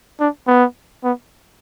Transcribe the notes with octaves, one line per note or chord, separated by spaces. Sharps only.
D4
B3
B3